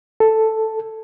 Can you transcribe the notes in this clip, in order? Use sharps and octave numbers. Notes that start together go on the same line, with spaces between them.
A4